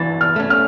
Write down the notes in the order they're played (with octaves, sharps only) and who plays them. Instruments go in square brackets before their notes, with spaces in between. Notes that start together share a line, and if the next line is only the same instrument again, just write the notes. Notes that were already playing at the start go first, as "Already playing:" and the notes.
Already playing: [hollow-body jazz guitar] E3 [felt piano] A6
[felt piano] F6
[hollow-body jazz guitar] A3 C#4
[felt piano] F6